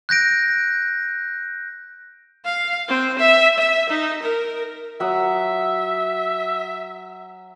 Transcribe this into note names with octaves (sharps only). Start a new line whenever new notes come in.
F#6 G6 A#6 D7
F5
C4
E5
E5
D#4
A#4
F#3 E5 F#5 D#6